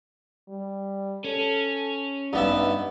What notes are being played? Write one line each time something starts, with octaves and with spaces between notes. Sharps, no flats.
G3
C#4 A4
G2 B3 D#4 E5